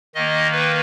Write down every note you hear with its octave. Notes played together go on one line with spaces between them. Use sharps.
D#3 A#3 D#5
B4